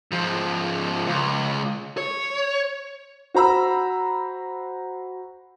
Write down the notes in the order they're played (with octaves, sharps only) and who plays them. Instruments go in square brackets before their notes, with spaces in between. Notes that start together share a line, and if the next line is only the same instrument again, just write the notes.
[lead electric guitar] G#2 F3
C#2
C#5
[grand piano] F#4 C5 A#5 B5 E6